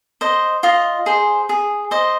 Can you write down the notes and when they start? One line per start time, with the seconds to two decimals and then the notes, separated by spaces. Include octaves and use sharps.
0.21 C5 D#5
0.63 F4 D#5
1.06 G#4 C5
1.49 G#4
1.91 C5 D#5